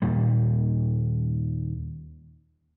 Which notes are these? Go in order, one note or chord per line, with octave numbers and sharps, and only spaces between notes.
D#2 A#2 G3